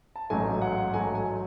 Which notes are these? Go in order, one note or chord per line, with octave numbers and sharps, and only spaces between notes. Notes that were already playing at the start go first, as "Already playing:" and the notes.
A5
A1 G#2 F#3 A3 G#5
F#5
A1 G#2 F#3 A3 G#5
G#5